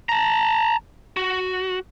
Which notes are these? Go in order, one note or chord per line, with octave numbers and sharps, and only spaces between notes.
A5 A#5
F#4